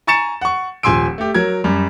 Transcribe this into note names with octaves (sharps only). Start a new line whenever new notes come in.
G#5 A#5 C#6 A6 C#7 E7
F#5 C#6
D#1 F3 G#5 C6 E6 D7
A3 G4
F#3 A#4 G#6
F#2 G3